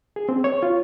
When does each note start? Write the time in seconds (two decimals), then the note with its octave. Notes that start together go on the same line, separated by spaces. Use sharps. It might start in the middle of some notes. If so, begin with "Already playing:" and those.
0.16 G#4
0.29 C4
0.44 C#5
0.63 F4